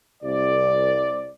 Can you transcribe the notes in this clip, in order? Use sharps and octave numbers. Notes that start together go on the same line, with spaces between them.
C2 D5